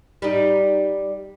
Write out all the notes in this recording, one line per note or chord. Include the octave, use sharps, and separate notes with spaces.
G3 D#4